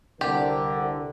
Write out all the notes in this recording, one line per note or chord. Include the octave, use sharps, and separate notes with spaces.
C2 D3 G4 A#4